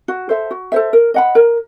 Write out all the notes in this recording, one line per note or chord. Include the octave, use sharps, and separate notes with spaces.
F#4
A4 C5 E5
F#4
A4 C5 E5
A#4
D#5 F#5 B5
A#4